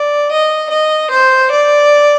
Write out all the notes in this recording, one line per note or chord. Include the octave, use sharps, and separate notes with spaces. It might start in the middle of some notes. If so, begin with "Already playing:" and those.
Already playing: D5
D#5
D#5
C5
D5